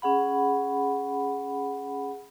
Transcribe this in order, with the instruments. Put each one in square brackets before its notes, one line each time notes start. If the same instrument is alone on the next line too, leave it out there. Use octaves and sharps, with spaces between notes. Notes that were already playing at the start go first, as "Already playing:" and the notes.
[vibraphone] C#4 G#4 F#5 B5